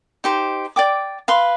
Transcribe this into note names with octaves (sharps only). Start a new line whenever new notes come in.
D#4 G4 C5
D5 G5 D6
B4 F5 C6